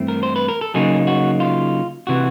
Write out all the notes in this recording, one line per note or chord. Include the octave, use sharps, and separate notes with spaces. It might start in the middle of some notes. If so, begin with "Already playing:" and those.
Already playing: G2 E3 A3 C4 E4
A#4
C5
B4
A#4
A4
C#3 F#3 A#3 D#4 G#4
F#4
F4
C3 E3 F#4